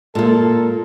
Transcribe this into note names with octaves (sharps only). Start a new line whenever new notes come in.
A#2 A#3 A4